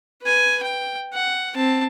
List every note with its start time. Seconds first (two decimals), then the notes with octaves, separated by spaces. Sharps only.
0.22 B4 G#5
0.63 G5
1.14 F#5
1.55 C4 A5